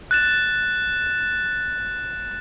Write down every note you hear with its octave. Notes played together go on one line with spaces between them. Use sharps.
F#6 A6 E7